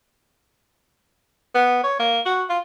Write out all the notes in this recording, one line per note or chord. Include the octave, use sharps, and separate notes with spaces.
B3
C#5
A#3
F#4
F4